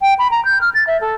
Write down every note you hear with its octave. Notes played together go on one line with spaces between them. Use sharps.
G5
B5
A#5
G6
F6
A6
E5
A4